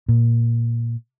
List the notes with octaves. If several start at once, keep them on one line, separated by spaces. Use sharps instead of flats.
A#2